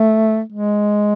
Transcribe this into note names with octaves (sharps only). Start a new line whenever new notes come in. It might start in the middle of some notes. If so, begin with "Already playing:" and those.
Already playing: A3
G#3